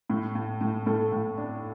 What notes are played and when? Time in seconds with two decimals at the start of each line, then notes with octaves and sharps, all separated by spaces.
0.10 A2
0.35 A2
0.61 A2
0.86 A2 A4
1.12 A2
1.37 D4